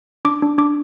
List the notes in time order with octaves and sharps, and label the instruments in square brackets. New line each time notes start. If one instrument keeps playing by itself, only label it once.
[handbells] D4 D6
D4
D4 D6